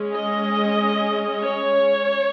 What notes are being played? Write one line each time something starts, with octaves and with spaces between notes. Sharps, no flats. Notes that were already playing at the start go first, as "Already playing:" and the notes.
Already playing: G#3 C#4
D#5
C#5